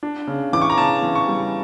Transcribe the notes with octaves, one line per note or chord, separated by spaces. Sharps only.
D4
C#3
E3 D6
C#6
A#5
C#3 A5
E3
C#6
G3